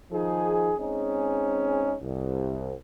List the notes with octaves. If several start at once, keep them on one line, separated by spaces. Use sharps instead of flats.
D#3 F3 D#4 G#4
G#3 C4 C#4 D#4 G#4
C2